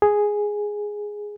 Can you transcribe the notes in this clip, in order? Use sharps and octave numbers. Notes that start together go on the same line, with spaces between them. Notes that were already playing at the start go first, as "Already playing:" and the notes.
G#4